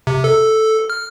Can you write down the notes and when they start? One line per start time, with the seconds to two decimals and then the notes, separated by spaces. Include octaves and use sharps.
0.07 C3
0.24 A4
0.90 F6